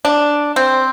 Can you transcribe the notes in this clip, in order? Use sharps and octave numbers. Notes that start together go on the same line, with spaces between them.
D4
C4